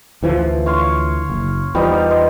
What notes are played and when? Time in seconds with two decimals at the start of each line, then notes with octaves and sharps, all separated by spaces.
0.23 D2 E3 F3
0.66 C#5 F5 C6
1.30 F#1
1.75 E2 F3 G3 B3 D#4
2.11 C5 D#5